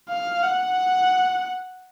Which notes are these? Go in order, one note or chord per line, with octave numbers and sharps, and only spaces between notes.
F5
F#5